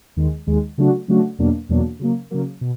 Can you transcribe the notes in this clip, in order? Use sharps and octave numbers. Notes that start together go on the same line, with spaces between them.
D#2 D#3 G#3
D#2 D#3 G#3
C#3 F#3 A3 D4 F#4
C#3 F#3 A3 D4 F#4
E2 B2 F#3 A#3 D4
E2 B2 F#3 A#3 D4
C#3 F#3 A#3
C#3 F#3 A#3
B2